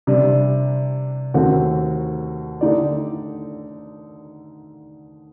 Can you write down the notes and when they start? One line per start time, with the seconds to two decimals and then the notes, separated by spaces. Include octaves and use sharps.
0.07 C3 G3 D4
1.34 D#2 D#3 A3 C4 F#4
2.61 D3 A3 D#4 G4 D5